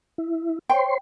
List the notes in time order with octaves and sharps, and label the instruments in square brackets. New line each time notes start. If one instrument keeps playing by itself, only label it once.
[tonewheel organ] E4
[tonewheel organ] C5 C#5 C6 [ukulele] G5